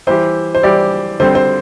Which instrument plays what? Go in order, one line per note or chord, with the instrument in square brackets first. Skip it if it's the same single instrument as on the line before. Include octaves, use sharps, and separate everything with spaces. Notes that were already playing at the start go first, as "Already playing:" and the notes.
[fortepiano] E3 G3 E4 G4 [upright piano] C5
[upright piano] C5
[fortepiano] E3 G3 E4 G4 [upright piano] D5
[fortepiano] D3 G3 C4 [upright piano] C5
[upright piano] C5